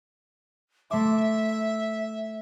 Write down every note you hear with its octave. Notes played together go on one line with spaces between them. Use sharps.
A3 E5 C6 D6